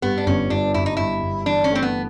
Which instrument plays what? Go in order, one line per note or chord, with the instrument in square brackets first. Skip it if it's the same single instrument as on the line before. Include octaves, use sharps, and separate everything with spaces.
[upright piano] G2 [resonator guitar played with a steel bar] B3
[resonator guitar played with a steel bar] D4
[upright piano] G1 [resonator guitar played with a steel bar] C#4
[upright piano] G1 [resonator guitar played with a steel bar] D4
[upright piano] G1 [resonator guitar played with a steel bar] E4
[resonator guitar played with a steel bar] D#4
[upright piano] G1 [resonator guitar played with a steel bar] E4
[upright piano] G1
[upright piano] E3 [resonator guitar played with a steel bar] D4
[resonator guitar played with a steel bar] C#4
[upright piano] A3 [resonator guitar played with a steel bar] C4
[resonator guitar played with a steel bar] B3